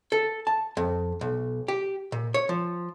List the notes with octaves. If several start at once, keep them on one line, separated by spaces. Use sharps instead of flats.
A4
A5
F2
B1
G4
A#2
C#5
F3